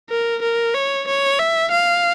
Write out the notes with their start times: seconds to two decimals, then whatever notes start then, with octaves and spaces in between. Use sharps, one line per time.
0.10 A#4
0.42 A#4
0.74 C#5
1.08 C#5
1.39 E5
1.71 F5